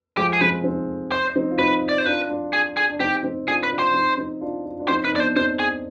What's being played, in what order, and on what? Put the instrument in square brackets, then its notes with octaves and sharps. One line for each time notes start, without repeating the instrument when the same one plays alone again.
[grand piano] F3 G#3 [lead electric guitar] G4
[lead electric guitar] G#4
[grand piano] G#3 C4 [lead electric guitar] B4
[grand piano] C4 D#4
[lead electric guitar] C5
[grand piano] C4 D#4
F4
[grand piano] C4 D#4 [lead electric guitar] B4
[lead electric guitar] D5
C5
[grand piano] D4 F4 [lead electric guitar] B4
[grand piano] D4 F4
[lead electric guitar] G#4
G#4
[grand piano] D4
[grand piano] C4 D#4 [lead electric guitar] G4
[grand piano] C4 D#4
[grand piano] D4 F4 [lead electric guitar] G#4
[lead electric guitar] B4
[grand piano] D4 F4
[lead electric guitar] C5
[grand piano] C4 D#4
C4 D#4
D4 F4
F4
D4 F4
[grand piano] C4 D#4 [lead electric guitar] C5
[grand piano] D#4 [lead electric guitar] B4
[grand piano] B3 D4 [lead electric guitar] D5
[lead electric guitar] C5
[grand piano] C4 D#4 [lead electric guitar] C5
[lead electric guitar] G#4